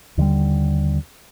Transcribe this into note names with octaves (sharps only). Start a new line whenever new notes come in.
D#2 D3 F3 G3